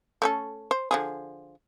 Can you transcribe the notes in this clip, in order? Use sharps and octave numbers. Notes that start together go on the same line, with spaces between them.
A3 C#4 A4
C5
D3 F3 G#4